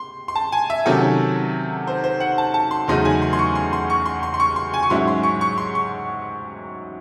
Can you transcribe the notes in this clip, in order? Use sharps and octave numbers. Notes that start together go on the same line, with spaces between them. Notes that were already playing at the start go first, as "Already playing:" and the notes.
Already playing: C6
C6
A5
G#5
E5
C3 D#3 F#3 C#4 A4
C5
C5
F#5
A5
A5
C6
E2 C#3 F#3 A3 D#4 C6
G#5
C6
C6
C#6
C6
C6
C#6
C6
C6
C6
C#6
C6
G#5
C#6
G#2 F#3 C#4 E4 C6
C6
C#6
C#6
C6
C#6